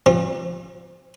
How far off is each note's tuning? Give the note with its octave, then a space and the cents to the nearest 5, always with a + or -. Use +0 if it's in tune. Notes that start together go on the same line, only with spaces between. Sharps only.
F3 +0 C4 +45